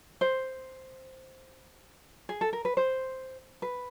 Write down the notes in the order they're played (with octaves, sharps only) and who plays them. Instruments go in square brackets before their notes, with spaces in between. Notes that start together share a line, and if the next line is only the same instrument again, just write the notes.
[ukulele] C5
G#4
A4
A#4
B4
C5
B4